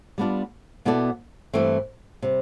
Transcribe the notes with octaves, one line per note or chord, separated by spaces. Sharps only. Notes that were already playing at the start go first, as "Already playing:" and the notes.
G3 B3 D4 F4
B2 B3 E4 A4 D5
G2 E3 A3 C4
C3 G3